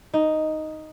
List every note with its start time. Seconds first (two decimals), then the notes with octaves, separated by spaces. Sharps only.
0.14 D#4